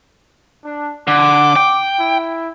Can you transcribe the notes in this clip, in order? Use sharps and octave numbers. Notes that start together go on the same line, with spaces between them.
D4
D3 D6
G5
E4